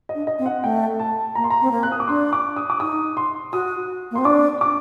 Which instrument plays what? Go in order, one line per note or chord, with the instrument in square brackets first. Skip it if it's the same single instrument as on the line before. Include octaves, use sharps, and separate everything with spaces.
[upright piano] D#5
[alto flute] D4
[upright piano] D#5
[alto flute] C4
[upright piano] F#5
[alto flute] A3 [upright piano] G5
[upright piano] A5
[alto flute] A#3 [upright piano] A#5
[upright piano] C6
A#5
[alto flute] C4
A#3
[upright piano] F#6
D#6
D6
[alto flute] D4 [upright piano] C6
[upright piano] D6
D#6
D6
[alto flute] D#4 [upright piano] D#6
[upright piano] C6
[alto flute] F#4 [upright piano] D#6
[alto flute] A#3
[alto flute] C4 [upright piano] C6
[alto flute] D4 [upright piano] D6
[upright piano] D6